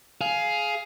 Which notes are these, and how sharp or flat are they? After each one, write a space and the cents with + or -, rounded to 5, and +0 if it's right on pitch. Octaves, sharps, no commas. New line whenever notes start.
G#4 +15 F5 +0